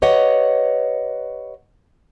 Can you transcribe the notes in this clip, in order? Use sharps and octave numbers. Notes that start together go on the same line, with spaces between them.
G4 B4 C#5 D#5 F#5